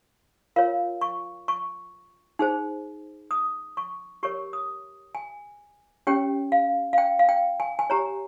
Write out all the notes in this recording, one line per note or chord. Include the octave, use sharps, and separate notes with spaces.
F4 A#4 C#5 F5
C#6
C#6
D#4 G#4 C5
D#6
C#6
G4 A#4 C#5 C#6
D#6
G#5
C#4 G4 C#5 G5
F5
F5
G5
F5
G5
G#5
G#5
G4 C#5 A#5